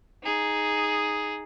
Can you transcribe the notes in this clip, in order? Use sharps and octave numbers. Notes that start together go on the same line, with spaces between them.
D#4 G#4